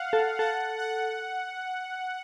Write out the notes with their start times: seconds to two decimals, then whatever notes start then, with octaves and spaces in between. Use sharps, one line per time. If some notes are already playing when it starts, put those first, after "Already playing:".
Already playing: F5 F#5
0.13 A4
0.39 A4 F#5
0.78 F#5